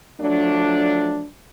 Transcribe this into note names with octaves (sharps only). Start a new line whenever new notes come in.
F3 F#3 A3 D4